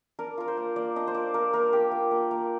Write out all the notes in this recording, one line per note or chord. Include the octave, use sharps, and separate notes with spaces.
D4 A#4
F4 A#4
C5
A#3
A#3 D5
D4 D#5
C5
F4 D5
A#3 A#4
A#3 A#4
D4 G4
F4
A#3
A#3